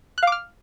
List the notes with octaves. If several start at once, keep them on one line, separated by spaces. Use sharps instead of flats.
F5 D6 F6 F#6